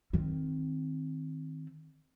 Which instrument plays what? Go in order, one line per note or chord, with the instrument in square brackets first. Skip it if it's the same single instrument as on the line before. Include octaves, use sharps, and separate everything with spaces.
[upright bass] D#3 C4